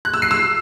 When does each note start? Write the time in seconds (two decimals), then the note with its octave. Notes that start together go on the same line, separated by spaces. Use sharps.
0.05 F#6
0.14 E6
0.22 C7
0.31 E6